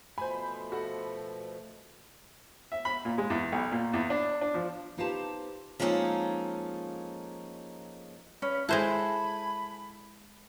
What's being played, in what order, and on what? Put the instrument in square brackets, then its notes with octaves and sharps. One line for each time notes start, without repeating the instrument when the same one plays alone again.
[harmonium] B2 F3 A3 [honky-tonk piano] C5 B5 [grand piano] G#5
[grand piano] F#4 A4 F#5
[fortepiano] E5
B5
A#2
G#3
E2
B1
A#2
E2
D4
D4
F3
[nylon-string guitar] B3 D#4 F4 G4 C5 A5
[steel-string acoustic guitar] F3 G#3 A#3 C#4 D#4 A4
[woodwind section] G2 B5 [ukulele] C#4
[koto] G#3 C5 F#5 [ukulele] E4 A4 [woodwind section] G#5 B5